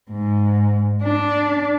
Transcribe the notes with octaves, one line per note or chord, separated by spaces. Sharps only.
G#2
D4